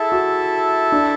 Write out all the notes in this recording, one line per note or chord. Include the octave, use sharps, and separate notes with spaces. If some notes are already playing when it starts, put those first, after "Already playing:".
Already playing: E4 G#4 A4 E5 A5
F#4
D4